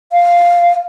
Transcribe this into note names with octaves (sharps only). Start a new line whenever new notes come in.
F5